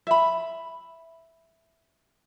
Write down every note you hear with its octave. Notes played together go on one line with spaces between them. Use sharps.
E5 B5